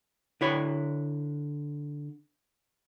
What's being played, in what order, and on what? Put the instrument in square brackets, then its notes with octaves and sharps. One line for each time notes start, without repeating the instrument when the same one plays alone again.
[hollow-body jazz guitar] D3 E4 C#5